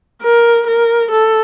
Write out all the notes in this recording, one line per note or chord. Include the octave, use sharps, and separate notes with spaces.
A#4
A#4
A4